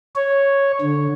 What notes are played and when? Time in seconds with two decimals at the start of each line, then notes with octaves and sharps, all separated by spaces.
0.16 C#5
0.82 D3